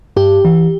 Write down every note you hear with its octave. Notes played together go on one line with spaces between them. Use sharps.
G2 G4
E3